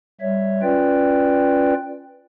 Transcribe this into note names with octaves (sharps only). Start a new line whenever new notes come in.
G3 C#5 E5
C#4 F4 B4 D5 G5